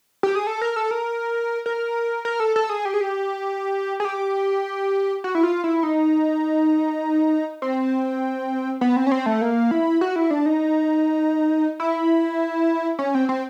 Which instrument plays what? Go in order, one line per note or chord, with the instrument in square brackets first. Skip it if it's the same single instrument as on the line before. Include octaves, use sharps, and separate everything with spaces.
[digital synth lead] G4
G#4
A4
A#4
A4
A#4
A#4
A#4
A4
A4
G#4
G4
G#4
G4
G#4
G4
F#4
E4
F4
E4
D#4
C4
B3
C4
C#4
C4
A3
A#3
E4
F#4
E4
D4
D#4
E4
C#4
C4
C4